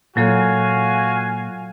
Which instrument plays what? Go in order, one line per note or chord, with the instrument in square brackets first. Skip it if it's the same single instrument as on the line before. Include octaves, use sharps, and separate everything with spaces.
[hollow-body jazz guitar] A#2 [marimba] F#3 A4 C#5 [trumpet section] F#4 F5 G#5